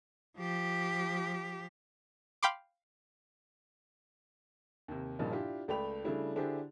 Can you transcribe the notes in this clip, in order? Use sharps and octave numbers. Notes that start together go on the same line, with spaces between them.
F3 G4
F5 G5 B5 C6 D6
D#2 C3
G2 A#2 C#3 F3 D#4
D4 E4 F4 G4
C#2 A3 D5 G5 B5 F7
C#3 G3 A3 D4 E4
D3 D4 E4 G4 G#4 C5